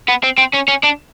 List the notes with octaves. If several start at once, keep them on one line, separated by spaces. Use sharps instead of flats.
B3
C4
C4
C#4
C#4
D4